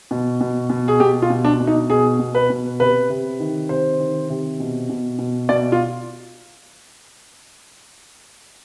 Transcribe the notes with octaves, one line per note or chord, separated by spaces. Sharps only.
B2
B2
B2
G#4
B2 G4
F4
B2
D4
B2
D#4
B2 G#4
B2
B4
B2
C3 B4
C3
D#3
C3 C5
D#3
C3
B2
B2
B2
B2 D5
F4